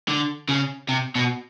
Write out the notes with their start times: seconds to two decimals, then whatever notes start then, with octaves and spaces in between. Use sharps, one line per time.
0.08 D3
0.49 C#3
0.89 C3
1.15 B2